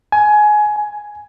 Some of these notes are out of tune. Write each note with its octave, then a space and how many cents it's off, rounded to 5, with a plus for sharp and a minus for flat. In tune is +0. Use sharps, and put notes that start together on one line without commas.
G#5 +20
G#5 +5